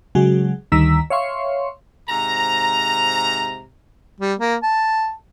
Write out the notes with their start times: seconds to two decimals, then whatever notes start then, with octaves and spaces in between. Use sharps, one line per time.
0.15 C#3 F#3 G#3 F#4 G#4
0.72 D2 D#3 G3 A#5 E6 B6
1.10 C#5 E5 F5 C6 C#6
2.09 G#2 C3 A#5
4.20 G3
4.40 A#3
4.63 A5